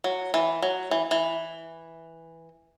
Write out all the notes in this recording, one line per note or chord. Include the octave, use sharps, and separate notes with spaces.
F#3
E3
F#3
E3
E3